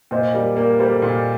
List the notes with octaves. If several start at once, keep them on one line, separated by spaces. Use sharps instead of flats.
A#2 C5 D#5
G3 A#4 D5
A#3 A#4 D5
G3 A4 C5
A#2